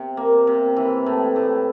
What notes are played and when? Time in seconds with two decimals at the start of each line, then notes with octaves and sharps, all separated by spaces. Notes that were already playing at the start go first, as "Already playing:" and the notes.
Already playing: C3
0.17 A#3
0.47 C3
0.76 E3
1.06 A2
1.36 A2